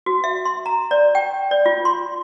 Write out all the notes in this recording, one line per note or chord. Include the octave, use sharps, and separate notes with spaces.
F#4
E5
C6
A#5
D5
G5
D5
F4
C6